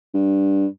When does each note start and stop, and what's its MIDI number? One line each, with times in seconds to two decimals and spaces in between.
0.14 0.66 43